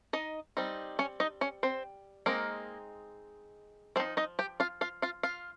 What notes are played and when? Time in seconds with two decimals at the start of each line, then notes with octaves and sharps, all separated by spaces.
0.13 D#4 D#5
0.57 G3 C4 D#4
0.99 C#4 C#5
1.20 D#4 D#5
1.41 C#4 C#5
1.63 C4 C5
2.26 G#3 A#3 C4 D#4 A#4
3.96 F3 C4 C5
4.00 D#4
4.17 D#4 D#5
4.39 G4 G5
4.60 F4 F5
4.81 F4 F5
5.02 F4 F5
5.23 F4 F5